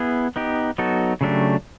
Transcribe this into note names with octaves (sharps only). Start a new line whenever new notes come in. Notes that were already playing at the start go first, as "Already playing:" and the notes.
Already playing: B3 E4 G#4
B3 D#4 G4
F#3 B3 D#4 F#4 A4
C#3 F#3 A3 D4 G4